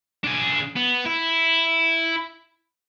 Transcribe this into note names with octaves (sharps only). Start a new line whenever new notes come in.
D4 G#4
B3
E4